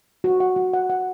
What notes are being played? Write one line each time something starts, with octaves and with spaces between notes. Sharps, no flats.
F#4
F#5
F#4
F#5
F#5